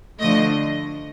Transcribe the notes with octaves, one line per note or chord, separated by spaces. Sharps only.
D3 F3 A3 D#5